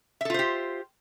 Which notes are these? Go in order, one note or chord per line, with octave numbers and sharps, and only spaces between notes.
F4 G4 A4 C5 E5